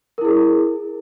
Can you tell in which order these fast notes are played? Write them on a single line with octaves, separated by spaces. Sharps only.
A#4 E4 G#4